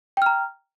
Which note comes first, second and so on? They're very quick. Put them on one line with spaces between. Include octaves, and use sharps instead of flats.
G5 F6 A#5